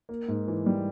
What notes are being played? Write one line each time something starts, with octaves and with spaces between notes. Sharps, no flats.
A#3
G#2
E3
G3